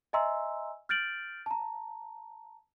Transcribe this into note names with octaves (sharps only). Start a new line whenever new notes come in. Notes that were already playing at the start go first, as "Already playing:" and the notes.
D#5 E5 G#5 A#5 C6 E6
F6 G6 A6 D7 F#7
A5 A#5